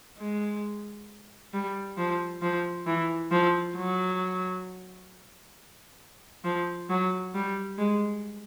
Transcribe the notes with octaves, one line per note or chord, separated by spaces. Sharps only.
G#3
G3
F3
F3
E3
F3
F#3
F3
F#3
G3
G#3